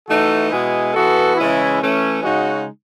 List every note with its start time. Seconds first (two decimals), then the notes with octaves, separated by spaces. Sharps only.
0.08 E3 A3 D#4 F#4 A4
0.51 B2 G#3 B3 E4 G#4
0.93 E3 B3 F#4 A4
1.36 C#3 E3 G#3 C#4 E4
1.79 E3 A3 C#4
2.22 C#3 G#3 D#4 F#4